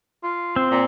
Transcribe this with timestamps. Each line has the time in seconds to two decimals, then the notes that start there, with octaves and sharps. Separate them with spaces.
0.23 F4
0.56 C4
0.71 A#2